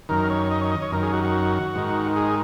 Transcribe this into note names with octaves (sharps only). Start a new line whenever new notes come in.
F#2 D#3 A#4
C#5
D#5
C#5
D#5
C#5
F#2 D#3 A#4
G#4
F#4
F#4
G#2 D#3
G#4